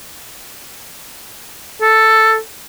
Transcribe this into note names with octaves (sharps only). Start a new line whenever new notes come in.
A4